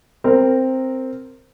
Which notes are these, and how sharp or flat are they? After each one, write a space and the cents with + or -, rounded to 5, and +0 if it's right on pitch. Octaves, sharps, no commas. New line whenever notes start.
C4 +0 A#4 -10